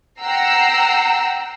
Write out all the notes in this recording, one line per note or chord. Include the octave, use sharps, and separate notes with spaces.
F#5 G5 A#5 E6 C7